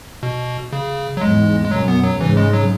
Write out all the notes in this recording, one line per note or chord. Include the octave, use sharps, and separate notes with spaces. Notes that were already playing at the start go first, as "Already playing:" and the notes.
B2
C#3
F#3
E2 G#2 G#3
G#3
F#2 B2 F#3
B3
F#3
G#2 C#3 E3
G#3
F#3